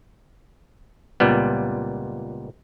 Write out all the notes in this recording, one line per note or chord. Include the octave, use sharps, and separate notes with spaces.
C#2 A#2 G3 B3